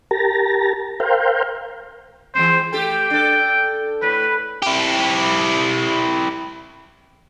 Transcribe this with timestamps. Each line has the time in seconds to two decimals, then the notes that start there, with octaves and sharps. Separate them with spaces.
0.11 G4 A#4 A5 A#5
1.00 A#4 C5 F5 G5
2.35 E3 G#3 C4 C5
2.73 A3 G4 A4 G5
3.10 D4 A4
4.02 A2 B4
4.63 E4 G4